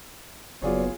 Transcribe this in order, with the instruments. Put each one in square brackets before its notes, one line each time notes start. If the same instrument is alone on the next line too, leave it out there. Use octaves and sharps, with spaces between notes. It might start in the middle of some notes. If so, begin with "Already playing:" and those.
[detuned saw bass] F#1 [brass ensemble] F#3 B3 [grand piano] F4 G#4 C#5 [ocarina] D5